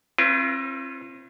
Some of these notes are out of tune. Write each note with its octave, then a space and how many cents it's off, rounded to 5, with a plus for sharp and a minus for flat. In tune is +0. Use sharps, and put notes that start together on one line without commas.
C4 +40 F4 -45 B4 +0